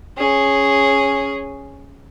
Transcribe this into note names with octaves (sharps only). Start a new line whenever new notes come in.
C#4 G#4